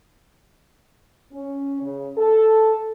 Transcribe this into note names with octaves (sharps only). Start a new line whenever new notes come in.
C#4
C#3
A4